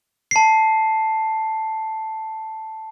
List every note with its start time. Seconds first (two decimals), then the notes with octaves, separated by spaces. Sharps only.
0.31 A5 C7